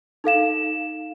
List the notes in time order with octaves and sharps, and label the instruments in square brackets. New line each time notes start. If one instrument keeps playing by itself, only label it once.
[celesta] D#4 A4 F5 E7